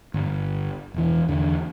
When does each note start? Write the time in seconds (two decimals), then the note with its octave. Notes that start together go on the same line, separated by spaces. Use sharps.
0.14 G1
0.94 E1 E3
1.28 E2 D3